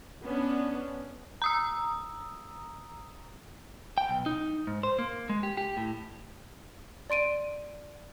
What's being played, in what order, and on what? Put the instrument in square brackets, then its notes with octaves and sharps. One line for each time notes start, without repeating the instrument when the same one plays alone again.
[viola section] B3 C#4 D4
[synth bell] A#5 D#6 E6
[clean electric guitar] G5
B1
D#4
G#2
C5
A#3
G#3
G4
G4
A2
[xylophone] D5 C6 D7 D#7